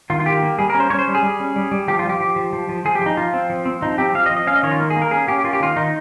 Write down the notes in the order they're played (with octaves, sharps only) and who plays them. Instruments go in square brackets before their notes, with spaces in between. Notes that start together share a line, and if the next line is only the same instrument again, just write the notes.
[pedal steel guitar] D#3 F4
F4
A#3 G4
A#3
G3 G#4
A#4
C#4
C5
C#4 C#5
C5
G3
G#4
G3
C#4
G3
G3
F3 G4
F4
F3
G4
F3
F3
F3
F3
F3 G#4
G4
F3 D#4
F3 F4
C4
F3
C4
F3 D#4
C4 G4
F3 F5
D#5
F3
D#5
C#4 F5
D#5
D#3 C#5
F4
A#3
G#4
A#3
A#4
C#4 G#4
C#4 G4
A#3 F4
G4
D#3 F4
D#3 D#4